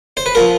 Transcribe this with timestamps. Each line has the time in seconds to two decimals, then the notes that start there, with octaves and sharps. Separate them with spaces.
0.17 C5
0.26 B4
0.35 F3 A#4